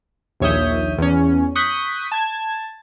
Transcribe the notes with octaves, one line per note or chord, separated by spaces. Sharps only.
A#1 D#2 C#5 E5 D#6 G6
E2 C#4
C#6 D#6 F#6 G6 B6
A5 G#6